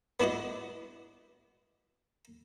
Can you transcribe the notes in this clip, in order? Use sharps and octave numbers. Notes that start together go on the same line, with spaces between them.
B3 D4 E4 F#4 D#5